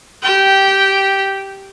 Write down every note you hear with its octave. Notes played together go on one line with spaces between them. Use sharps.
G4 G5